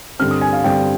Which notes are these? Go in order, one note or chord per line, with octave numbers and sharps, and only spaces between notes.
G2 D3 G3 C4 F6
D#6
G#5
F5
G2 D3 G3 C4 G5